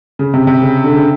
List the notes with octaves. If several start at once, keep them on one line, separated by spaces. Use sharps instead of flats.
C#3
C3
C3
C#3
D3
C#3